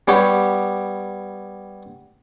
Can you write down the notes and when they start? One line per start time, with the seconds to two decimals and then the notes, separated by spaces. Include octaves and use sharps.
0.08 G3 B3 G4 C#5